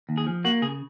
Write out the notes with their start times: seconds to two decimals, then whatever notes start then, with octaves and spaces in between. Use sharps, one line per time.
0.09 D#2
0.18 G#4
0.26 F3
0.44 A#3 F#4
0.62 C#3 G#4